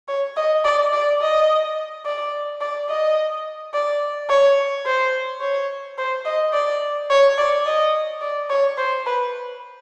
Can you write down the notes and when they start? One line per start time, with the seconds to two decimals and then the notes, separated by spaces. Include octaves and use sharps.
0.08 C#5
0.36 D#5
0.64 D5
0.93 D5
1.22 D#5
2.05 D5
2.61 D5
2.89 D#5
3.74 D5
4.30 C#5
4.86 C5
5.41 C#5
5.98 C5
6.25 D#5
6.53 D5
7.10 C#5
7.38 D5
7.66 D#5
8.21 D5
8.50 C#5
8.77 C5
9.06 B4